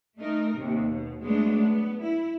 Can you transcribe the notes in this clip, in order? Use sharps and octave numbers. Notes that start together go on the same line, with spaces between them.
A3 D#4 A#4
D#2 C3
B2
F#3 G#3 A3 B3 D4
B3
E4